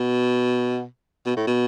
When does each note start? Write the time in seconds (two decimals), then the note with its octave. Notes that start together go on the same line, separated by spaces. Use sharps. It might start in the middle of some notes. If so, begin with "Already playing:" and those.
Already playing: B2
1.26 B2
1.37 A2
1.47 B2